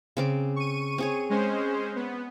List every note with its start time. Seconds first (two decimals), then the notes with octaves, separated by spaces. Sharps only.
0.17 C#3 C4 D6
0.56 C#6 D#7
0.98 C4 G#4 C#5
1.30 G#3 C#4 C5
1.96 B3